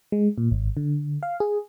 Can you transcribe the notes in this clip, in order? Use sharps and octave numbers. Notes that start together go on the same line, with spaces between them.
G#3
A#2
G#1
D3
F5
G#4